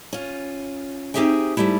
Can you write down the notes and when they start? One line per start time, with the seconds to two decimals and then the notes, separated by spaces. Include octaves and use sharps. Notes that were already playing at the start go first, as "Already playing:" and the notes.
0.13 C#4 F4
1.14 C4 D#4 G4 G#4 E5 G5
1.57 G#2 E3 G3 A3 E4